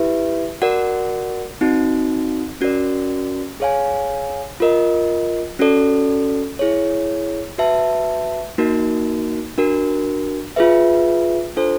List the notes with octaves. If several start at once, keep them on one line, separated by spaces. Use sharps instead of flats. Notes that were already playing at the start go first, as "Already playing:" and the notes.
Already playing: E4 G4 B4 E5
F#4 A#4 D5 F#5
C4 D#4 F#4
C#4 F#4 A#4 D5
G#4 C#5 F5 G#5
F4 A#4 D#5
C#4 F#4 A4 D5
E4 G#4 C#5
F#4 B4 E5 A5
A#3 D#4 F#4 A#4
D4 F#4 A#4
F4 G#4 B4 E5
D4 F4 A4 C5